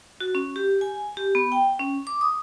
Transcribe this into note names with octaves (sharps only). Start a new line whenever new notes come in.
F#4
C#4
G4
G#5
G4
B3
G5
C#4
D6
D#6